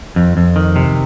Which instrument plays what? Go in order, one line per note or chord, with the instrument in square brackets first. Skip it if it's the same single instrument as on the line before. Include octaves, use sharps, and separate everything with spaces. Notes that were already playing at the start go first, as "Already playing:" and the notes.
[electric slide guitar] F2
F2
D#3
C3